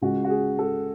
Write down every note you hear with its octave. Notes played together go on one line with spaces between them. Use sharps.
C#2 C#3 G#3 C#4 F#4
F#4
G#4
A4